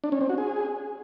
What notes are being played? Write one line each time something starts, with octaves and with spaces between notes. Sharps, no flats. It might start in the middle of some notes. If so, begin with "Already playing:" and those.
D4
C#4
C4
F#4
G#4